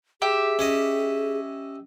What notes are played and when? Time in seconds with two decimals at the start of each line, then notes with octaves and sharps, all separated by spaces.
0.22 G4 G#4 E5
0.59 C#4 C#5 D#5